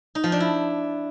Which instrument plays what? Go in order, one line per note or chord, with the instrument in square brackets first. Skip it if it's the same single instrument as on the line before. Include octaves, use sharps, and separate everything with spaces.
[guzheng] D#4
F3
D4
E4